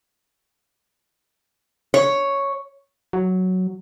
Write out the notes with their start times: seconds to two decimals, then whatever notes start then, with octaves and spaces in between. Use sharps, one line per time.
1.94 C#5
3.13 F#3